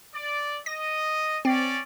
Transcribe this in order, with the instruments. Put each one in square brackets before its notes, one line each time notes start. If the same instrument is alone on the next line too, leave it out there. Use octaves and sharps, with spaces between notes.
[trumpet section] D5
[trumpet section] D#5 [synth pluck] A#6
[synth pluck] C4 [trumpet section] C#4 D5